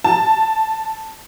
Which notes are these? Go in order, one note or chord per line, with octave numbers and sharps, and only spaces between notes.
A5